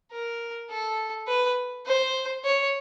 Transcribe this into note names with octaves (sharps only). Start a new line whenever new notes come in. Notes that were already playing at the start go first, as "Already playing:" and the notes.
A#4
A4
B4
C5
C#5